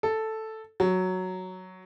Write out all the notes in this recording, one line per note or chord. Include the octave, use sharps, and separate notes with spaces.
A4
F#3